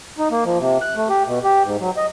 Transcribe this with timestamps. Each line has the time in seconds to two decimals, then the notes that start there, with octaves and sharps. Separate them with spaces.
0.18 D#4
0.31 A#3
0.45 F3
0.59 C3
0.82 F#6
0.96 A3
1.09 G4
1.26 B2
1.44 G4
1.64 G#2
1.80 F#3
1.97 D#5